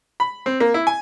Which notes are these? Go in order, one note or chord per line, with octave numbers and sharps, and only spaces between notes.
B5
C4
A#3
E4
G#5